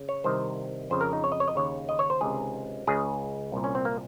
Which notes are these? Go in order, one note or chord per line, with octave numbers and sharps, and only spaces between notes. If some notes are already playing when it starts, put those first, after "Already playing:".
Already playing: C#3
C#5
C2 C3 D#3 C5
F2 C#3 C5
A#4
D#4
C#5
D#5
C#5
D#5
D#2 C#3 C#5
D#5
C#5
C5
C#2 C3 D#3 G#4
C#2 C#3 G#4
C2 A#2
C#4
C4
A#3